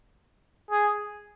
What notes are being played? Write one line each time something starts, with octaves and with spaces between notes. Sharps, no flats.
G#4